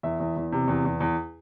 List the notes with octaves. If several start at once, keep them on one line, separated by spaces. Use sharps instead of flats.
E2 E5
E2
E2
C3
E2
E2
E2